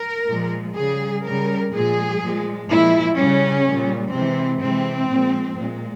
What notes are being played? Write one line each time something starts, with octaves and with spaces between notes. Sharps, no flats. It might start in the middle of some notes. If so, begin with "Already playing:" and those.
Already playing: A#4
A#2 F3 G#3
C#3 G3 G#4
C#3 G3 A#4
A#2 F3 G#3 G#4
A#2 F3 G#3
A#2 F3 G#3 E4
C#3 G3 C#4
A#2 G3
C3 E3 G#3 C4
C3 E3 G#3 C4
A#2 F3 G#3
A#2 G#3